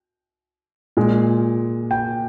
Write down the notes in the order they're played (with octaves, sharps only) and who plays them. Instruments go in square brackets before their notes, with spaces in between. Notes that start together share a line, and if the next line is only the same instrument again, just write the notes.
[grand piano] A#2 G#3
G5